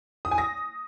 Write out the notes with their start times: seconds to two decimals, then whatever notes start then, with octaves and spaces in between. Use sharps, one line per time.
0.25 D#6
0.31 G#5
0.38 A#6